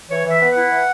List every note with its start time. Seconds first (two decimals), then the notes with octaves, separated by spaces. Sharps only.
0.10 E3 C#5
0.24 E3
0.30 E5
0.41 B3
0.51 E4 F#5
0.71 E3